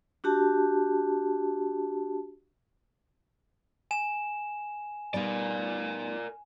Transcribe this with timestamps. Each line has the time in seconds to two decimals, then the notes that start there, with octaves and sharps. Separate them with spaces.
0.24 D4 F#4 G4 A5
3.91 G#5 E7
5.14 G3 B3 D#4 A#4 D5